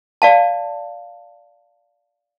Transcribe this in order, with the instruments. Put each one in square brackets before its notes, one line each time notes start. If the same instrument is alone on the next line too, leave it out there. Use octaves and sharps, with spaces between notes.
[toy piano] D5 F5 A5